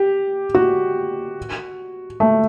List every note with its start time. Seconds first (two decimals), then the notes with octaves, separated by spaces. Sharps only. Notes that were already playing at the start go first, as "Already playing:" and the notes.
Already playing: G4
0.55 F#4
2.20 A3